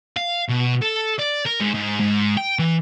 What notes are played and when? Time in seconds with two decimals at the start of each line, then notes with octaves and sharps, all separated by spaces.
0.16 F5
0.49 B2
0.82 A4
1.19 D5
1.45 A#4
1.60 G#2
1.74 G#2
2.00 G#2
2.37 G5
2.59 E3